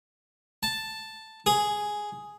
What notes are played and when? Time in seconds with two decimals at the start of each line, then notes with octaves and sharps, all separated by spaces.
0.63 A5
1.46 G#4